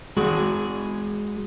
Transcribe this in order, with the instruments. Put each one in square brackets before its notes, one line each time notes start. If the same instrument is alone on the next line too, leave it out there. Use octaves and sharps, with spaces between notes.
[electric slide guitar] G#3 F#4 G#4